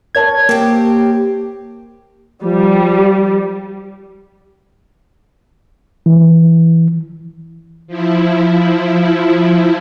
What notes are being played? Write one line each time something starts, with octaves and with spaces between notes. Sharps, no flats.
A#4 C#5 A5 G#6
A#3 C4 G4
F3 G3
E3
F3 E4